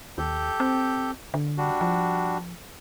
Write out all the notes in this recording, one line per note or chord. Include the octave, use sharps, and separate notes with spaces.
D#2 G4 A4 G6
C4
D3
G3 D4 F#4
F3